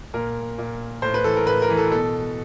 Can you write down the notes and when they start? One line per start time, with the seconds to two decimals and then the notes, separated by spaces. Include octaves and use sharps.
0.14 A#2 A#4
0.58 A#2
1.02 A2 C5
1.14 B4
1.24 E3 A4
1.37 A#4
1.47 A2 B4
1.62 A#4
1.70 E3
1.77 A4
1.91 B2 A4